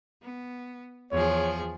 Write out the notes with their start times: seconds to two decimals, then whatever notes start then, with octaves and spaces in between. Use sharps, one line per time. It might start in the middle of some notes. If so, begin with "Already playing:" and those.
0.23 B3
1.12 E2 F3 G#4 C#5